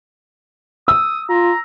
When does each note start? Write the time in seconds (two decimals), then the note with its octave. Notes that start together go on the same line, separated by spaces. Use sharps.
0.88 D#6 E6
1.29 F4 A#5